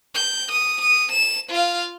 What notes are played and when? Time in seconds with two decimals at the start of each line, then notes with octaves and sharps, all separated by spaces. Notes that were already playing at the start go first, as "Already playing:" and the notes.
0.15 G6
0.51 D#6
0.81 D#6
1.12 E7
1.50 F4 F5